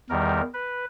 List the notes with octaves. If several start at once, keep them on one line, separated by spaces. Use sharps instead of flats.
E2 D#3 G3 A#4
B4